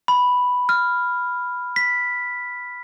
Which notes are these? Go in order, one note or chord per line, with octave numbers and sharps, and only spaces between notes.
B5
F6
B6